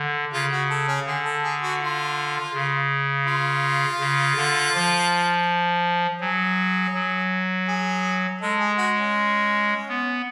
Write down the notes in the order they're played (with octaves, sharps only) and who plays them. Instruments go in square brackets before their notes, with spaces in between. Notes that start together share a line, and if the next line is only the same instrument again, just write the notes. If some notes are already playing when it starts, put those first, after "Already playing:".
Already playing: [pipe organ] D3
[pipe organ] C#3 [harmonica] F4
[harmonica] F#4
A4
C#4
[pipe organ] D3 [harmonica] G#4
[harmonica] A4
G#4
F#4
F4
[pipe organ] C#3
[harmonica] F4
[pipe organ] C#3
D3
F3
[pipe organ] F#3 [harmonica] G#4
[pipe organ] F#3
[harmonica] G#4
[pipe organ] G#3 [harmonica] A4
[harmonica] G#4
F#4
C#4
[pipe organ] B3